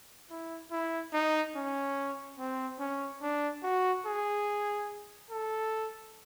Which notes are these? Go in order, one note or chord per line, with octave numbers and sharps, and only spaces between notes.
E4
E4
D#4
C#4
C4
C#4
D4
F#4
G#4
A4